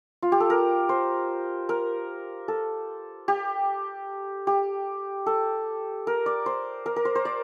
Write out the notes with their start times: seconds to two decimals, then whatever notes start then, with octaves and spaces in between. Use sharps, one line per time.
0.23 F4
0.32 G4
0.40 A4
0.50 A#4
0.89 C5
1.69 A#4
2.48 A4
3.28 G4
4.47 G4
5.26 A4
6.07 A#4
6.26 D5
6.46 C5
6.86 A#4
6.96 A#4
7.05 C5
7.15 C5
7.25 D5